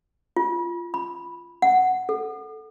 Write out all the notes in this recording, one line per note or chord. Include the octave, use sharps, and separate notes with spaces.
F4
B5
F#5
A4